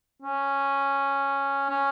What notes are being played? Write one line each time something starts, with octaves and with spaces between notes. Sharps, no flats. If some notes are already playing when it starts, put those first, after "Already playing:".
C#4
C#4